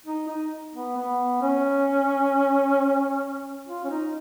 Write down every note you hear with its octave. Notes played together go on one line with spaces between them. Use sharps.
D#4
D#4
B3
B3
C#4
F4
C#4
D#4